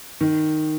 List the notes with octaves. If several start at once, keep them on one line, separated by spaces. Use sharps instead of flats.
D#3